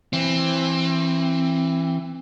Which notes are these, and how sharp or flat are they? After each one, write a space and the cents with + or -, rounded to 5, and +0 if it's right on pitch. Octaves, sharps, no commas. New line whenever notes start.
E3 +15 C4 +20